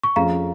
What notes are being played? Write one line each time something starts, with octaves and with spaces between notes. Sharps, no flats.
C#6
F2 F3 C#4 G#4 F5 A#5